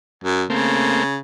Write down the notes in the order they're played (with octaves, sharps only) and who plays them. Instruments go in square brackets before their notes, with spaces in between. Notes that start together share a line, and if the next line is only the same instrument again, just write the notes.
[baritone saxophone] F#2
[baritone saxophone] C#3 [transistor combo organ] A3 A#3 C4